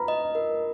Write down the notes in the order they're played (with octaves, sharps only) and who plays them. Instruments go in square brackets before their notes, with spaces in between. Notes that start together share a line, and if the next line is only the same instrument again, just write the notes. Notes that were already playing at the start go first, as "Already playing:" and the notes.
Already playing: [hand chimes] B4 [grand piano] A#5 B5
[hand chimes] D#5
A#4